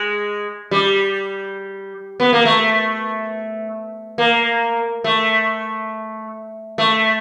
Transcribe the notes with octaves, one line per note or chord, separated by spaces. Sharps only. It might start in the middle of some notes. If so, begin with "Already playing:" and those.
Already playing: G#3
G3
B3
A#3
A3
A#3
A3
A3